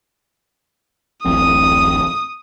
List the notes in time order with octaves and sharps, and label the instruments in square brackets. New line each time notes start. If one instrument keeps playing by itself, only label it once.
[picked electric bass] D1 A1 C4 [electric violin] D#6